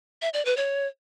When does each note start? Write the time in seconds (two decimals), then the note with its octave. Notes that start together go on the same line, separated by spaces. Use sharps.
0.22 E5
0.34 D5
0.45 B4
0.57 C#5